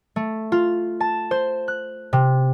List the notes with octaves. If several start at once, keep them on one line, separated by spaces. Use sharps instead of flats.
A3
F4
A5
C5
F#6
C3